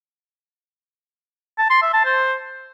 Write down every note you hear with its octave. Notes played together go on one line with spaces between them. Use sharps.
A5
C6
E5
A5
C5